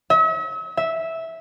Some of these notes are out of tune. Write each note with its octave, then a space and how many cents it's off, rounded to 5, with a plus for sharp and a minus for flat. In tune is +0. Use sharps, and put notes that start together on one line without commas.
E5 -40
E5 -10